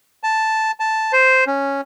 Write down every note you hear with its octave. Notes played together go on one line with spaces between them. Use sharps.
A5
A5
C5
C#4